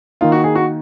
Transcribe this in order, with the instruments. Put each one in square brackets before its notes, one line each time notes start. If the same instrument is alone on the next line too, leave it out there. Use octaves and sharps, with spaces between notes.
[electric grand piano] D#3 A#3 D#4 [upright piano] F4
[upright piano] F#4
G#4
F#4